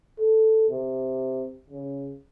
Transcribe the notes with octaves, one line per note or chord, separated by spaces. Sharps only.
A4
C3
C#3